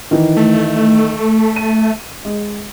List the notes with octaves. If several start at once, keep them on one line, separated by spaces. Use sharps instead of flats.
D#3 E3
A3
D#7
G#3